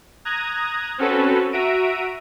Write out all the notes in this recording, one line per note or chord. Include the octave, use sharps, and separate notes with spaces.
A#5 D#6 F#6 G#6 A#6
C4 C#4 F#4 A4 B4
F#4 E5 A#5 D7 D#7